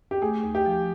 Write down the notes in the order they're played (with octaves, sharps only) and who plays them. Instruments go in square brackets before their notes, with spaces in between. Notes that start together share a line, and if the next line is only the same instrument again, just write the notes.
[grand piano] G4
[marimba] A3 [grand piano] G#4
[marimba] D#2
[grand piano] G4
[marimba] F3